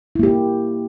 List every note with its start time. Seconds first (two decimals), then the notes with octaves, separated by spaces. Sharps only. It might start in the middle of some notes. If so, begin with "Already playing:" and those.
0.16 E4
0.19 A#3
0.23 G4